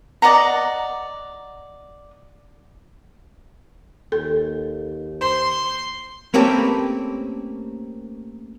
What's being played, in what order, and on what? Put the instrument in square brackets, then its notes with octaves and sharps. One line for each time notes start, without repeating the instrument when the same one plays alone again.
[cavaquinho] D5 D#5 F#5 A#5
[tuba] D#2 [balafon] A4
[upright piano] C5 [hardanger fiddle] C6
[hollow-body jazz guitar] A3 A#3 C4 C#4 G4 B4